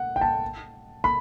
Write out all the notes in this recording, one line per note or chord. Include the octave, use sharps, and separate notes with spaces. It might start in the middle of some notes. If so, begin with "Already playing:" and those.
Already playing: F#5
G5
A5
B5